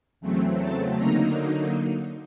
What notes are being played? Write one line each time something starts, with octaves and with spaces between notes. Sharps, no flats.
E2 C#3 F#3 A3 C4
A5
D3 F#3 A#3 D#4 A#5